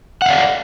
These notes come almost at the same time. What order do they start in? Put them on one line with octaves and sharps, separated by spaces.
F#5 F5 D5